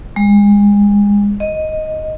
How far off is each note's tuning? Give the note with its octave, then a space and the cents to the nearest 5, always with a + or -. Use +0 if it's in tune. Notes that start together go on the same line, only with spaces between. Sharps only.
G#3 -30
D#5 +5